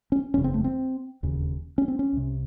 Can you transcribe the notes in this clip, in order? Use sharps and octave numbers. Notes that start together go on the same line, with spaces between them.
C#4
F#1 E2 C#3 C#4
C4
A3
C4
E1 D#2 C#3
C#4
C4
C#4
C2 C3